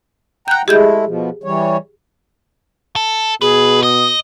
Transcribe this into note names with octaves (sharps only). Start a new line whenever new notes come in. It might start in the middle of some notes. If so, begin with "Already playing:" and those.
F#5 G5 A#5 F#6 G6
G#3 A3 E4 G4 G#4 G6
B2 F3
E3 G3 C#5
A4
B2 G#4 B4
D#5 D#6